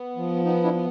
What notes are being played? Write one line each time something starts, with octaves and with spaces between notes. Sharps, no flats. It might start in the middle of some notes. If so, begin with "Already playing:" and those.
Already playing: B3
F3
B3 D#4
D4 E4
B3